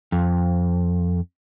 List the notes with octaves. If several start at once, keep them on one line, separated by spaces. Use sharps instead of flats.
F2